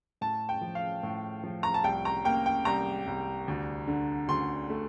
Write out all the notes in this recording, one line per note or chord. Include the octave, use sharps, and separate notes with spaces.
A2 A5
G5
F3
F5
A2
F3
A#5
A5
C2 G5
A#5
A#3 G5
G5
C2 A#5
C2
D2
D3
D2 C6
A3